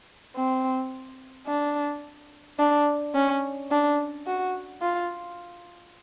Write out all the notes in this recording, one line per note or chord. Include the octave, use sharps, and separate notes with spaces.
C4
D4
D4
C#4
D4
F#4
F4